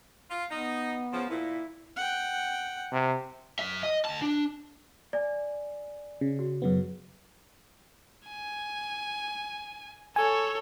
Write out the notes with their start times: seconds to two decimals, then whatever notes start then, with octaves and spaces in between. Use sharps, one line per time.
0.30 F4
0.51 B3 D#4
1.12 C#3 F3
1.30 A#2 E4
1.97 F#5 G5
2.92 C3
3.59 F#2 E5
3.83 D#5
4.05 D2 A5
4.22 D4
5.13 D5 G#5
6.21 C#3
6.39 F#4
6.62 F#2 C#3 B3
8.27 G#5
10.16 A4 C#5 G#5